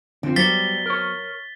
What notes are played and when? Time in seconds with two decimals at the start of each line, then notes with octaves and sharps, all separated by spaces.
0.23 D3 F3 C4
0.36 F#3 G3 B3 C5 A6 B6 G7
0.86 A#4 C#5